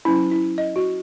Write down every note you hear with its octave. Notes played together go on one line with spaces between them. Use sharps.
F#3 C#4 E4
E4
D#5
F#4